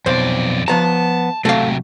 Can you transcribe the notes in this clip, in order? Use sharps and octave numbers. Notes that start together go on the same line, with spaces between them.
B1 F2 C5 D5
F3 B3 A5 A#5
C3 F#3 A3 F5